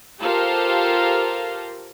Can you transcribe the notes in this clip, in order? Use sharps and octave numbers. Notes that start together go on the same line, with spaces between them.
F4 G4 A4 A#4 C5 F5